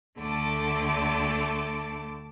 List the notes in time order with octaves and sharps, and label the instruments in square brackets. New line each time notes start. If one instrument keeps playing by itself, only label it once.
[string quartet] D2 D3 A3 A5 D6